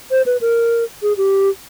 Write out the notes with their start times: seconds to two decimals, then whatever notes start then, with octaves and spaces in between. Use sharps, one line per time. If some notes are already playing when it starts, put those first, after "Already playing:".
0.11 C5
0.26 B4
0.41 A#4
1.02 G#4
1.17 G4